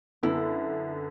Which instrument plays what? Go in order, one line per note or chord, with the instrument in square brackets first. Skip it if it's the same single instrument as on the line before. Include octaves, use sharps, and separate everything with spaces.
[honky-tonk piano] F#2 D3 B3 [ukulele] E4